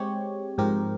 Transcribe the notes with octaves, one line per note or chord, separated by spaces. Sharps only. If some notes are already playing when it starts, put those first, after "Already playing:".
Already playing: G#3 C4 G4 C#5
G#2 F3 C4 G4 A#4